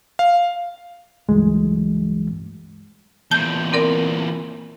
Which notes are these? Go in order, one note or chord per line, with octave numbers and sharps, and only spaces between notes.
F5
C#2 G2 E3 F#3 G#3 A3
E2 A#2 A5 G6
C4 A#4 D5